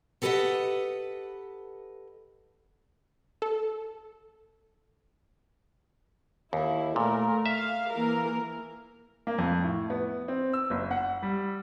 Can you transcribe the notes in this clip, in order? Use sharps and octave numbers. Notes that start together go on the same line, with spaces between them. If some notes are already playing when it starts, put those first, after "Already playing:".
G4 A4 B4 C5 D#5 F#5
A4
D#2 E4
A#2 A3 A#4
E5 F5
E3 A#3 A#4
A#3
F2
A2
B3
C4
E6
F#1
F#5
G3